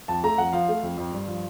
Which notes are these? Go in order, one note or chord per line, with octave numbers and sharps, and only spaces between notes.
F2 A5
A3 A#5
F2 F#5
F3 F5
A3
F2
F2
G2
F3